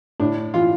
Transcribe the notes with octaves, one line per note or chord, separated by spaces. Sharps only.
A2 D4
E3 F4